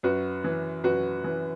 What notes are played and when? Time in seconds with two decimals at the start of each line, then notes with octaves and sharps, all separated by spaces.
0.03 F#2 F#4 B4
0.44 E3
0.83 F#2 F#4 B4
1.24 E3